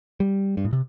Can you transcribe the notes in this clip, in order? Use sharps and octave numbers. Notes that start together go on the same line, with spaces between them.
G3
G2
A2
C3